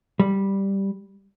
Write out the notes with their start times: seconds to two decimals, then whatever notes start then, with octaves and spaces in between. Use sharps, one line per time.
0.20 G3